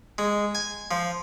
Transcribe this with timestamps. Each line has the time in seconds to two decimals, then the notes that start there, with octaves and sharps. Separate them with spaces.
0.18 G#3
0.55 G#5
0.91 F3